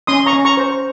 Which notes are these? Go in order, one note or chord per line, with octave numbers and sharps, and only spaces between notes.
C#4 C6 D#6
A#5 C#6
C#4
A#5 C#6
C5